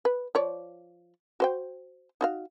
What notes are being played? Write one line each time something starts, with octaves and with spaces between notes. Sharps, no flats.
B4
F3 C#5 D5
F#4 C5 G5
D#4 F#4 F5